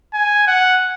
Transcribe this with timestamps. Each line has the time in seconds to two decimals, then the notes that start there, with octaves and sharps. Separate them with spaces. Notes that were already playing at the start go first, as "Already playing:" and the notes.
0.13 G#5
0.47 F#5